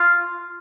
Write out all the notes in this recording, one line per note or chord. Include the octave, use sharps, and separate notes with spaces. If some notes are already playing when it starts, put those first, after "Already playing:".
Already playing: F4